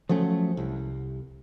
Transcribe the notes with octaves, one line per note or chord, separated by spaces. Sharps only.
F3 F#3 A3 C#4
C2